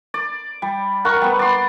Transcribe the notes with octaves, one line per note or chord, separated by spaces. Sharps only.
D5
G3
A#4 F#5 C#6
G3 B3
D5 C6